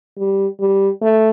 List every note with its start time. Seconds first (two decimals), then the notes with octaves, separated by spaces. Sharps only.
0.18 G3
0.60 G3
1.01 A3